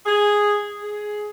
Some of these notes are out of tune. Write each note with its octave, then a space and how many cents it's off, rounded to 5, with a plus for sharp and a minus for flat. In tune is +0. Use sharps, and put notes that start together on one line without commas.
G#4 -5
G#4 +10